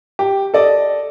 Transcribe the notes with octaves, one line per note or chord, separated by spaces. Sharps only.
G4
A4 D5 D#5